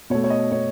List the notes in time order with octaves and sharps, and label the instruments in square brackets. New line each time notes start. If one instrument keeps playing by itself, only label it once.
[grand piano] B2 C#5
A3
C#5
D#5
B2 A3 C#5